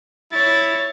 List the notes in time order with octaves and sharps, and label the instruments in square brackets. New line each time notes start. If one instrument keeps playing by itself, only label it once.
[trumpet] E4 [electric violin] C#5 A6